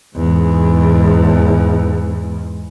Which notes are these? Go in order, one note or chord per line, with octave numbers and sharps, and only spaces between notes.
E2 G#2